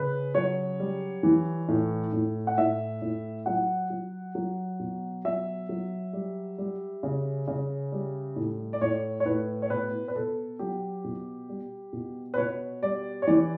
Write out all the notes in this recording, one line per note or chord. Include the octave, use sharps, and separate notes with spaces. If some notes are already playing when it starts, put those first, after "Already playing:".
Already playing: C#3 B4
F#3 C#5
G3
E3
A2
A2
F#5
A2 E5
A2
F#3 F#5
F#3
F#3
B2
F#3 E5
F#3
G3
G3
C#3
C#3
G3
A2
D5
A2 C#5
C#5
A2 B4
C#5
B2 B4
B4
B2 A4
F#3 G4
B2
G3
B2
B4
B2 C#5
G3 D5
C#5
E3 D5